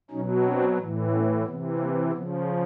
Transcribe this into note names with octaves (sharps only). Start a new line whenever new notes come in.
B2 F#3 C#4 D#4
C4 D4
A2 E3
B3 C#4
C3 E3 B3
A#3
C#3 F3 B3